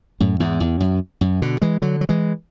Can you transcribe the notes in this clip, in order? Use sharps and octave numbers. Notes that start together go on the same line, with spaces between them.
F#2 A2
E2 G#2
E2
F#2
F#2
B2 D3
E3 G#3
D3 F#3
F#3
E3 G#3